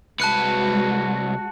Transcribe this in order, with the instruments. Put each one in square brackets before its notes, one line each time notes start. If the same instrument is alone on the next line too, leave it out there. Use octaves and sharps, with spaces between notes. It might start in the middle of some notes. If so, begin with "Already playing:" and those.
[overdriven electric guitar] C2 B4 [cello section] G#3 F#4 [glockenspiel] A5 F#6 C#7